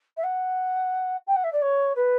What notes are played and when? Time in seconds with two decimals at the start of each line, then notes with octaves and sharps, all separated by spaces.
0.17 E5
0.23 F#5
1.27 G5
1.36 F#5
1.44 E5
1.52 D5
1.62 C#5
1.95 B4